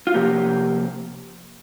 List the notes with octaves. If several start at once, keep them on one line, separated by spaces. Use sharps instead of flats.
F4
C3 F3 A#3 G4